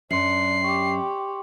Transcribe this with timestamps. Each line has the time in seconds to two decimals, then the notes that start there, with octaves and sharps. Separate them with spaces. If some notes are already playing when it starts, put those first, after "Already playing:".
0.11 F#2 D4 C6 C7 C#7 F#7
0.64 G4 C#6 D6